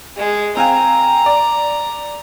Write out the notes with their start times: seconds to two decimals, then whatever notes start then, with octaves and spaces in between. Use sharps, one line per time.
0.17 G#3
0.57 C4 F5 G#5 A#5
1.26 D5